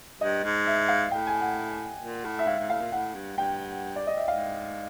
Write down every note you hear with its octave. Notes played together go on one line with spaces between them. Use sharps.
G2 D#5
G#2
E5
F5
A2 G5
G#5
F#5
A#2
A2
E5
G#2 F5
G#2
A2 F5
A#2
A2 F#5
G2
G2 G5
D5
D#5
E5
G#2 F5